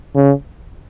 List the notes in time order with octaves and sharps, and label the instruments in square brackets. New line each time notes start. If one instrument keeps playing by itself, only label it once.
[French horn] C#3